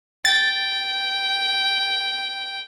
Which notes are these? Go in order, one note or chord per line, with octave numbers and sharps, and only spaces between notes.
G5 A6